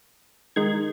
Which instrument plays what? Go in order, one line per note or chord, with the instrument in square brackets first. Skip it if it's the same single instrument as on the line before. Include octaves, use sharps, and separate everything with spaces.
[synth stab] D#3 G#3 G#6